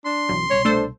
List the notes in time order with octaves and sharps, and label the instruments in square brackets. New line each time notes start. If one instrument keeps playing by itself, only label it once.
[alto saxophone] D4 [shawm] C6
[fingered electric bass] B1 B2 E3 [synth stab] F#2
[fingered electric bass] C2 B2 G3 [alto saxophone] C#5
[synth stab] A3 A4 C5 [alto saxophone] D4